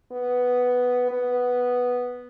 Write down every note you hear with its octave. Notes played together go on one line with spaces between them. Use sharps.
B3
B3